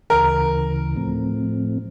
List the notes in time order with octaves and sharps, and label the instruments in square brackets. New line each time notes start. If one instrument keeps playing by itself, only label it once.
[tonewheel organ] D2 C#3 E3 [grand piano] A#4
[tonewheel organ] A2 F3 A3 C4